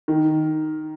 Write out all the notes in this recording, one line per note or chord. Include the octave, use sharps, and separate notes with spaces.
D#3